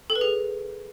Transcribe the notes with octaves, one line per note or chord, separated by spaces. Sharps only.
A4
B4
G#4